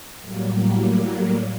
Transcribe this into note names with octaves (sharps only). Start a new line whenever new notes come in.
A2 F#3 G3 A#3